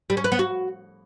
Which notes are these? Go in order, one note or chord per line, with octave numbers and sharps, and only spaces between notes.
G3
C#4
B4
B3
F#4